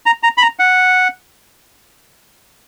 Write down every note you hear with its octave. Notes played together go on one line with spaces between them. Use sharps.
A#5
A#5
B5
A#5
F#5